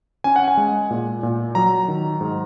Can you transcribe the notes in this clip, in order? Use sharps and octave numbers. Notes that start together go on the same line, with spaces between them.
C#4 G#5
F#5
G#5
G#3
A#2
A#2
F#3 A#5
D#3
G#2